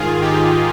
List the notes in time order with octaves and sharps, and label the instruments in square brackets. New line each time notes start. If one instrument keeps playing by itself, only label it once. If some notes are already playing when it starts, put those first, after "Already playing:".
Already playing: [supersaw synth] G#2 D#3 F4 G#4
D#4 G4